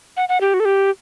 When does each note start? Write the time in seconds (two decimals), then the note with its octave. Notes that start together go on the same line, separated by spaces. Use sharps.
0.17 F#5
0.29 F#5
0.41 G4
0.54 F#4
0.60 A4
0.65 G4